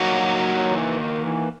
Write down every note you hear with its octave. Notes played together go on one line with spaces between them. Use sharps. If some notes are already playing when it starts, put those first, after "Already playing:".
Already playing: F#3 A#3 D#4 F#4
E3
D#3
E3